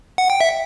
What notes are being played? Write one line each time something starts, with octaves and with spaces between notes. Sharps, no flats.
F#5
G5
E5